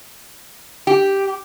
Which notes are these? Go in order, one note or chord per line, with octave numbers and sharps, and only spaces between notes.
G4